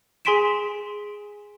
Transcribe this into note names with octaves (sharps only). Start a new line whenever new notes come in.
G#4 G#5 C6 B6 D7 E7